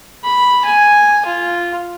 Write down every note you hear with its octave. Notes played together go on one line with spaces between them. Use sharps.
B5
G#5
F4